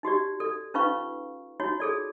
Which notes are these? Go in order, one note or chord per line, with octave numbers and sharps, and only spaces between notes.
D#4 F#4 G4 D5
A4 D5
C#4 D#4 F4 B4 F5 C#6
D#4 F4 F#4 C#5
G#4 A4 D5